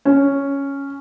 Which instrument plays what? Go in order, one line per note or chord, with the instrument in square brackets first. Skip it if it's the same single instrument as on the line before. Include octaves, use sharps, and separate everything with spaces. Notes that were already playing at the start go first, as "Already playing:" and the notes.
[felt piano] C#4